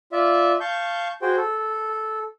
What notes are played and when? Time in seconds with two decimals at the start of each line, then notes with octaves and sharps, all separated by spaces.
0.12 F4 D5 E5
0.60 F5 A5 C#6 G6
1.22 F#4 G#4 C5 G5
1.37 A4